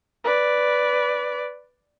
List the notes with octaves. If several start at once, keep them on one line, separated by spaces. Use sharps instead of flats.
B4 D5